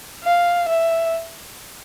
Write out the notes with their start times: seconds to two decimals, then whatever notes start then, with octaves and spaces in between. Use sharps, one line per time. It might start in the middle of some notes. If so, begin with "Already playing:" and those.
0.24 F5
0.69 E5